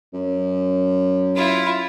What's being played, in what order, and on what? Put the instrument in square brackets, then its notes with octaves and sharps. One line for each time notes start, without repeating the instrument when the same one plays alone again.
[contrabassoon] F#2
[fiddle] E4 F4